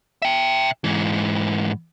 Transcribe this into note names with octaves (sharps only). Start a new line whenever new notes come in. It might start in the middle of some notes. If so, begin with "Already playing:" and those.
E5 G5
G#2 E3